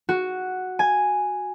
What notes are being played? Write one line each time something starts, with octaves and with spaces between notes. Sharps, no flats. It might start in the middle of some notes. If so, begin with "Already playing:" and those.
F#4
G#5